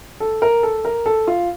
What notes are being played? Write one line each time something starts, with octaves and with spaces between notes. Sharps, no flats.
A4
A#4
A4
A#4
A4
F4